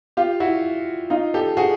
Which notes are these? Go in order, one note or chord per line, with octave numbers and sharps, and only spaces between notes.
F4 G4
E4 F#4
D#4 F4
G4 A4
F#4 G#4